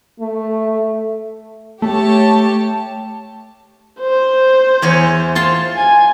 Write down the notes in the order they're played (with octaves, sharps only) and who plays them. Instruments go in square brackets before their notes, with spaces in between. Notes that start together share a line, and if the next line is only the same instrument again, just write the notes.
[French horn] A3
[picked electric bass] A3 [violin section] G4 C#5 A5
[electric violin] C5
[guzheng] E2 C#5 G#5
F4 A5 C6
[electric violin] G#5